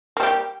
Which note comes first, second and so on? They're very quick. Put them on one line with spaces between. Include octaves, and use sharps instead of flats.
A#3 G3 G4